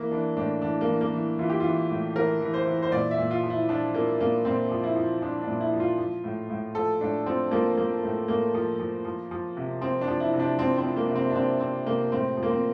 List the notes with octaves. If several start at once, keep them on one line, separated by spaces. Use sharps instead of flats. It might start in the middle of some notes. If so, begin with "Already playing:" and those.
Already playing: E3 A#3
E3 D4
A2 D4
E3 D4
A#3
E3
A#3
E3
E3 F4
G4
E3 F4
A2
E3 A#4
E3
C5
E3
C5
A#2 D5
E5
A#2
F4
F3
E4
F3 D4
A#2 A#3
A#2 A#3
A#2 C4
F3
E4
F3
F3 D4
D4
A#2
E4
F3
F4
F3
A2
A2
F3 A4
A2 D4
F3 C4
F3 A#3
F3 A#3
A2
A2 A#3
F3
F3
F3
F3
C3
F3 C4
D4
F3
E4
C3
D4
F3 C4
C4
F3
A#3
C3
C4
D4
C3 C4
C3 C4
C3 A#3
A2 C4
F3
A#3
C4